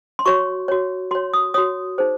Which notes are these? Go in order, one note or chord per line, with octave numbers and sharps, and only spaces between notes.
C6
F#4 C#5 C#6
F#4 C#5
F#4 C#5 C6
D#6
F#4 C#5 D#6
D#4 G#4 C5